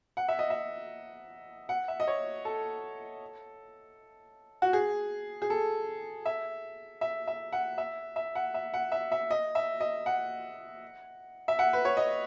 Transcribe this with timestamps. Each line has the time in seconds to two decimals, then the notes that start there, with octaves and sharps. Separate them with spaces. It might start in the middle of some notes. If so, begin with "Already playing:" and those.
0.17 F#5
0.29 E5
0.39 D#5
0.50 E5
1.69 F#5
1.88 E5
2.00 D#5
2.07 C#5
2.45 A4
4.62 F#4
4.73 G#4
5.42 G#4
5.50 A4
6.26 E5
7.01 E5
7.28 E5
7.53 F#5
7.78 E5
8.16 E5
8.35 F#5
8.54 E5
8.74 F#5
8.92 E5
9.12 E5
9.31 D#5
9.55 E5
9.80 D#5
10.06 F#5
11.48 E5
11.59 F#5
11.73 B4
11.85 C#5
11.97 D#5